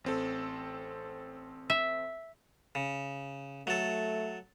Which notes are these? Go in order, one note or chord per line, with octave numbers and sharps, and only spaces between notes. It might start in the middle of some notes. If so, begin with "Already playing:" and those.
A1 C4 A4
E5
C#3
F#3 A3 A4